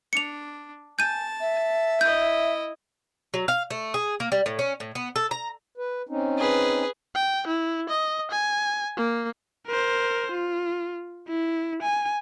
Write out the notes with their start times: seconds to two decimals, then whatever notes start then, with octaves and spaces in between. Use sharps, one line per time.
0.13 D4 C#7 F7
0.99 G#5 A5 G6 D#7
1.40 E5
2.01 E4 D#5 G6
3.34 F#3
3.48 F5
3.71 A3
3.94 G#4
4.20 A#3
4.32 G3
4.46 A2
4.59 C#4
4.80 A2
4.95 B3
5.16 A4
5.31 A#5
5.78 B4
6.09 C4 C#4 D#4
6.38 G#4 B4
7.15 G5
7.47 E4
7.89 D#5
8.31 G#5
8.97 A#3
9.66 A#4 C5
10.32 F4
11.28 E4
11.83 G#5